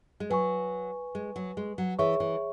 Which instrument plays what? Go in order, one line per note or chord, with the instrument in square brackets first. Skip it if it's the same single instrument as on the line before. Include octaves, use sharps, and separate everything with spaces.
[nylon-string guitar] G#3
[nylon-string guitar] F#3 [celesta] B4 G#5 C#6
[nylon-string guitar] G#3
F#3
G#3
F#3
[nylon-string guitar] E3 [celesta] G#4 C#5 E5 C#6
[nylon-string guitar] E3